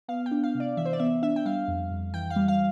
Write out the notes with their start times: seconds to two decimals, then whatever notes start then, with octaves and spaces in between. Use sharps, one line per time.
0.08 B3 F5
0.26 G5
0.31 D4
0.43 F5
0.55 C3
0.60 D5
0.77 E3 E5
0.85 C5
0.93 D5
1.00 B3 E5
1.23 D4 E5
1.36 G5
1.45 G3 F5
1.68 F2
1.91 F2
2.13 E3 G5
2.30 F5
2.36 G3
2.48 F5